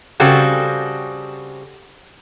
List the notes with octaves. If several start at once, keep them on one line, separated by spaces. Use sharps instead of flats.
C#3 G3 C4 F#4 A4